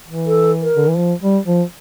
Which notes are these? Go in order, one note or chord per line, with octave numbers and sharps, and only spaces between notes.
E3
A4
A#4
D3
E3
F3
G3
F3